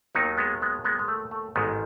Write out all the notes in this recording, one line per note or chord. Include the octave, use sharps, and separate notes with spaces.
D#2 D#3 F#3 B3 D#4
G#3 B3
G#3 B3
G#3 B3
G#3
A3
A3
A1 G#2 D#3 G#3 B3